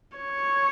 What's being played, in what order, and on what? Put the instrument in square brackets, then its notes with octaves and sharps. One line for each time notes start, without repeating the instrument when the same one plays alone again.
[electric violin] C#5